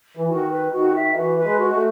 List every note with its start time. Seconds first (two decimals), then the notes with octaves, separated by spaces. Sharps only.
0.17 E3
0.28 D#3 F#4
0.50 B4
0.72 D#3 F#4
0.93 E5
1.15 E3 F#4
1.37 B4
1.43 G#3
1.59 F#4
1.73 A3